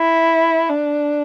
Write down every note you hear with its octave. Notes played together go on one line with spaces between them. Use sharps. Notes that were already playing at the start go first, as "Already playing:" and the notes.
Already playing: E4
D4